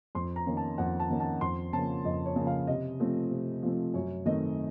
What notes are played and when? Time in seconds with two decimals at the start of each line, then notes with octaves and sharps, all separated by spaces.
0.15 F2 C6
0.36 A#5
0.46 D#3 A#3 C#4
0.57 A5
0.78 F2 F#5
1.00 A5
1.10 D#3 A#3 C#4
1.20 A5
1.41 F2 C6
1.73 C#3 F3 A#3 A5
2.05 F2 D#5
2.26 C#5
2.36 C#3 F3 A#3
2.47 F5
2.67 C3 D#5
3.00 F3 A3 C4
3.31 C3
3.63 F3 A3 C4
3.94 F#2 C#5
4.26 D#3 A3 C4 D#5